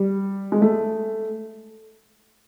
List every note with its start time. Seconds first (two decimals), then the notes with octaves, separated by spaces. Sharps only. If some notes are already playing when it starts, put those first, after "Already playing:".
Already playing: G3
0.52 G#3
0.62 A3